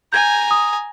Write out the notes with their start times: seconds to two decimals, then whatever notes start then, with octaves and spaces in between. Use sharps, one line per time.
0.13 G#5 A#5 G6 G#6
0.51 D#6